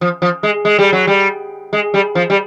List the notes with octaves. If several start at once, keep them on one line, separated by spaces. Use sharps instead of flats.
F3
F3
G#3
G#3
G3
F#3
G3
G#3
G3
F3
G3